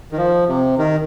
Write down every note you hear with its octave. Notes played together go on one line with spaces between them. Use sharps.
D#3
F3
C3
D#3